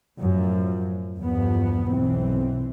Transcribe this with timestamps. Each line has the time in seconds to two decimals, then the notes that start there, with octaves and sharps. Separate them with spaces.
0.18 F#2 A2 F3
1.18 E2 G2 F3 B3
1.90 B1 E3 C4